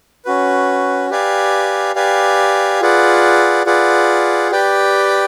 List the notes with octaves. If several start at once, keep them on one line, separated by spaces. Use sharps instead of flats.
C#4 F#4 B4
G4 B4 D5 F5 G#5
G4 B4 D5 F5 G#5
F4 G#4 B4 D5 F#5
F4 G#4 B4 D5 F#5
G4 B4 D5 G5